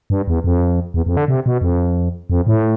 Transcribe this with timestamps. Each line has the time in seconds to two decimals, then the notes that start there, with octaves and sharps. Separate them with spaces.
0.10 G2
0.28 E2
0.44 F2
0.94 E2
1.06 F2
1.17 D3
1.28 C3
1.46 B2
1.62 F2
2.30 F2
2.47 A2